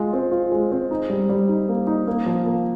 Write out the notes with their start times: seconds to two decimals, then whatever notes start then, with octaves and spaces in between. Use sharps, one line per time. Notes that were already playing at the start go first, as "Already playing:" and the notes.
Already playing: G#3 F4
0.13 C4
0.32 F4
0.52 G#3
0.72 C4
0.91 D#4
1.10 G3
1.29 G3
1.49 D#4
1.69 A#3
1.87 D#4
2.07 A#3
2.26 F3
2.46 A#3